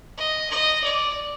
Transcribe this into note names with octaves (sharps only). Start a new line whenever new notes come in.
D#5
D#5
D5